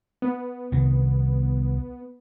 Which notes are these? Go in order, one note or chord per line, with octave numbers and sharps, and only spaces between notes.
B3
C2 D#3